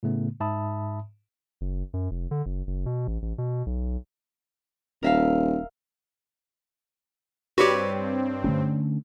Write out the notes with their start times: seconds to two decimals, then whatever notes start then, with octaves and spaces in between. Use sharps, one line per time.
0.03 A2 C#3 A3 B3
0.40 G#2 E5 A5 B5 D#6
1.61 F#1
1.93 F#2
2.11 F1
2.31 D3
2.46 F#1
2.67 F#1
2.86 B2
3.07 A1
3.22 A1
3.38 B2
3.66 B1
5.03 D#1 A#4 E5 F5
7.58 G2 C4 F#4 G4 B4 C#5 D5
8.44 D3 A3 C#4